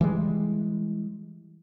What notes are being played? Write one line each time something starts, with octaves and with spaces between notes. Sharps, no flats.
E3 G3 G#3